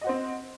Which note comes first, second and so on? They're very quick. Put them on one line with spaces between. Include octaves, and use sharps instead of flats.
D#5 F#4 C5 C4